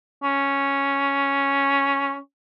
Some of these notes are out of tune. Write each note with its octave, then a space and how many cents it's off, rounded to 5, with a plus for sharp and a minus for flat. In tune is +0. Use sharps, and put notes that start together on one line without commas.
C#4 +0